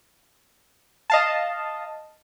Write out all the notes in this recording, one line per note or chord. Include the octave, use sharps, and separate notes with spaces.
D#5 F5 A5